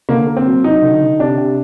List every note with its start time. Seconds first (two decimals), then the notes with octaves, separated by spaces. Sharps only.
0.09 D3 A#3
0.27 A#3
0.37 C4
0.47 F#3
0.64 F#3 D#4
0.82 D3
1.01 D3
1.19 C3 D4
1.38 C3